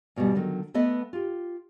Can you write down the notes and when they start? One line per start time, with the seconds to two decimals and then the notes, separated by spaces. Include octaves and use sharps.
0.16 E2 B2 F3 G3
0.35 D3 D#3 F#3
0.74 A3 B3 B4 D#5
1.13 F4 G4